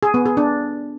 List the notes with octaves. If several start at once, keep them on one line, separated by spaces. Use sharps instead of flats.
G#4
B3
G#4
D4